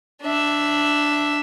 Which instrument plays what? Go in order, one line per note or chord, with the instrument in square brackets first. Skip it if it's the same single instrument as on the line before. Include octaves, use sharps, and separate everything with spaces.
[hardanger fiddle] D4 E5